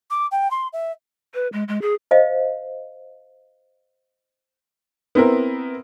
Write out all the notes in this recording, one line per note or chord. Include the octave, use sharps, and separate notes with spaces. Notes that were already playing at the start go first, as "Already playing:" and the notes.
D6
G5
C6
E5
B4
G#3
G#3
G#4
C5 D#5 F5
B3 C4 E4 A#4